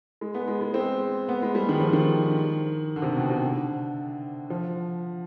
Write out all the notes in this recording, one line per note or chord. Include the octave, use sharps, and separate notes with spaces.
G#3
B3
G#3
G#3
C4
B3
G#3
G3
D#3
F3
D#3
D3
C3
B2
C3
D3
F3